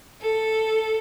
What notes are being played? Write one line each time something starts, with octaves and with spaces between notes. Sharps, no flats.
A4